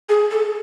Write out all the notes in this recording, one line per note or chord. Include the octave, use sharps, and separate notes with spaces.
G#4
A4